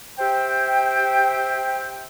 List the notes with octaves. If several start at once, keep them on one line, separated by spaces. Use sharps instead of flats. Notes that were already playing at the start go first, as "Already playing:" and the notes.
G4 C5 E5 G5